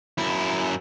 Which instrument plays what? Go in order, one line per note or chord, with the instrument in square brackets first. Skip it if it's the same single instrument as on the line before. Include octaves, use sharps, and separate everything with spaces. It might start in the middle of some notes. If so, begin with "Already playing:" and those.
[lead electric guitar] F#2 E4